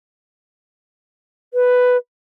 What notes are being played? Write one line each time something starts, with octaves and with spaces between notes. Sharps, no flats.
B4